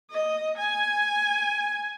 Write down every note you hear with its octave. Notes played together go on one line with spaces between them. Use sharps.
D#5
G#5